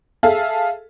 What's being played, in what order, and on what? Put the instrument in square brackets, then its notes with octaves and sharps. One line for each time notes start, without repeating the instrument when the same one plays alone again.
[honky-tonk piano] G#4 A4 E5 F5